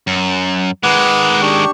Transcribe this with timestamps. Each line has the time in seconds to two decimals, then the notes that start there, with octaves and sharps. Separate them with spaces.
0.07 F#2
0.83 D#3 G#3 B4 F#5 D6
1.42 D4 G4 C#6